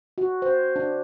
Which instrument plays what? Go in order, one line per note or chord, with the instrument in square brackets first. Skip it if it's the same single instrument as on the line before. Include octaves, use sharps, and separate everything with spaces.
[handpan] F#4
C5
D4